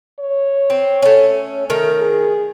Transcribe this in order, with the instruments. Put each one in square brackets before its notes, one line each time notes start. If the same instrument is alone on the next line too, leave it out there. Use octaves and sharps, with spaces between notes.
[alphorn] C#5
[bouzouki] C4
A3 C#4
[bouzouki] D#3 A#4 [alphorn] A3
[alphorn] G#4